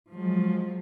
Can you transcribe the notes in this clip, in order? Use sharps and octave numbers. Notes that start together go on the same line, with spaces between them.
F3 F#3 G#3